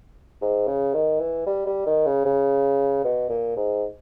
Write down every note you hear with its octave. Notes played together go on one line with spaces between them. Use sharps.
G#2
C#3
D#3
E3
G3
G3
D#3
C#3
C#3
B2
A#2
G#2